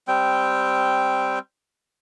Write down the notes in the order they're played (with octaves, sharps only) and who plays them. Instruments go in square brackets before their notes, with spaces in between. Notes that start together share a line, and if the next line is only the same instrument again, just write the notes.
[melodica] G3 C4 G5